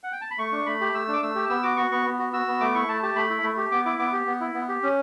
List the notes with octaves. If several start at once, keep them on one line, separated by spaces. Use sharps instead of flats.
F#5
G5
A5
B5
A3 C#6
D4
A3 B5
G4
A3 E6
D4
D6
A3 E6
G4
B3 E6
F#4 D6
F#4 C#6
B3 C#6
B3
F#4
F#4 E6
B3
A3 D6
E4 C#6
A3 A5
G4 A5
A3 B5
E4
A3
G4
B3 D6
E4 D6
B3 D6
G4
B3
E4
B3
G4
C#4